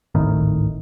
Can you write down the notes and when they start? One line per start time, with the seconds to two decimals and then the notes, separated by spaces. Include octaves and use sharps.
0.15 D1 G#1 A2 D#3